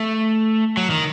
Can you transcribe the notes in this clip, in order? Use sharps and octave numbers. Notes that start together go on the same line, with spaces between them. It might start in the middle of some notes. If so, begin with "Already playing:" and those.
Already playing: A3
F#3
D#3